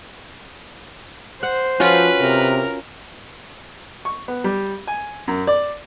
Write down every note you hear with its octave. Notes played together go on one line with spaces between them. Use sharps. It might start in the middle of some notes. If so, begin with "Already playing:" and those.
C5 F#5
F3 C#4 F4 F#4 B4
C3 A#4
C#6
B3
G3
G#5
F#2
D5